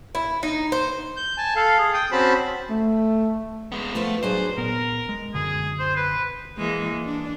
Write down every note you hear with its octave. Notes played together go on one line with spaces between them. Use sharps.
E4
D#4
C5
G6
G#5 A5
A4 F5
G#4
G5 D#6
C4 C#4 F#4 C5 A5 B5
A3
G#3 B3
F3 A3 B3 F4
F#3 D4 G#4 C5
A#2 B3 A#4
G#3
F#2 B2 D3 G#4
C5
B4
E3 G#3 A#3
D4